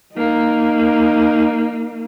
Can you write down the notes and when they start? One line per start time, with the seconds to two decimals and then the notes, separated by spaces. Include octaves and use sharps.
0.14 A#3 D#4